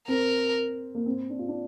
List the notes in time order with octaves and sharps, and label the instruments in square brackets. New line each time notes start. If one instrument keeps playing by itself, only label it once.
[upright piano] C4 [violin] A#4
[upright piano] A#3
C4
D4
F4
D4